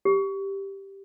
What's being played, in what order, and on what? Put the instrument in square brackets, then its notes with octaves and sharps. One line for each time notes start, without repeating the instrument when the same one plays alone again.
[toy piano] G4